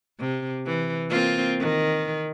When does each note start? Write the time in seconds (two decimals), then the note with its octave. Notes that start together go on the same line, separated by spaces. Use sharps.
0.19 C3
0.66 E3
1.09 A#3 C4 F4
1.59 D#3